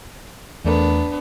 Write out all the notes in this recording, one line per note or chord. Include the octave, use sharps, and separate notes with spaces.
E2 A3 B3 D4 A#4